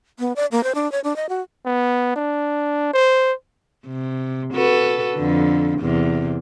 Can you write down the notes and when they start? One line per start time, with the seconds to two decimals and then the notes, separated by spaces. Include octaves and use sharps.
0.19 B3
0.36 D5
0.52 A#3
0.64 C5
0.75 D4
0.92 C#5
1.04 D4
1.16 D#5
1.29 F#4
1.66 B3
2.16 D4
2.94 C5
3.86 C3
4.53 F#4 A4 B4
5.16 F2 D3
5.79 E2 C3